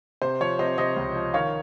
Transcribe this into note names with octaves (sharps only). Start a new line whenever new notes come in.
C3 C5
F3 C#5
C3 C5 D#5
C3 C5 D#5
C#2
F3
D#3 C#5 F5